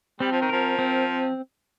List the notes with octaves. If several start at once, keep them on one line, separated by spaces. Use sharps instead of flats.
G3 C4
F3
D#3
F3 A#4
C4